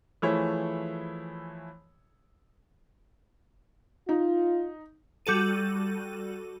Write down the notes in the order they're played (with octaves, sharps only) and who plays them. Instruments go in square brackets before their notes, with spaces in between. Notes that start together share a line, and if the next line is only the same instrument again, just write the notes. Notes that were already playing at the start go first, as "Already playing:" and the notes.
[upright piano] E3 F3 A3 E4 G#4 C#5
[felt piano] D#4 [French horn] F4
[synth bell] G3 F#4 A4 D#7